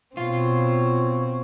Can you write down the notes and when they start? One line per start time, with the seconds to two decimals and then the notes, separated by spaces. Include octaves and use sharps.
0.17 B2 C4 F4 C#5